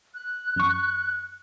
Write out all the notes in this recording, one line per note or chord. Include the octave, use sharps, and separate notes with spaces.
F#6
F#2 C#6